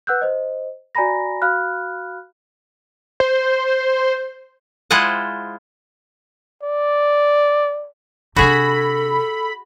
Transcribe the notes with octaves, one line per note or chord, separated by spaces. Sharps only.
B4 F#5 E6 F#6 G6
C5 D#5
F#4 D5 G#5 A#5 B5 A#6
F#4 F5 B5 F6 F#6
C5
G#3 E4 F4 C5 D#5 F#5
D5
C3 D4 F#4 G#4 A4 B5